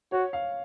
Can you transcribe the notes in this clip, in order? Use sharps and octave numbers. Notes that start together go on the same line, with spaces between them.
F#4 C#5
F5